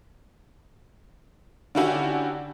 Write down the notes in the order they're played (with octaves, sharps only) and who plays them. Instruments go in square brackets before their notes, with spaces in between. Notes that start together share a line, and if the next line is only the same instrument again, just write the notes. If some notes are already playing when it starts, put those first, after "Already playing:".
[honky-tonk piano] D3 D#3 C#4 E4 F#4 G4